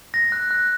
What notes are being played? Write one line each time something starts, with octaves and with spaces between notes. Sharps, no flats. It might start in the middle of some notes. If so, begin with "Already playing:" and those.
A#6
F#6
F#6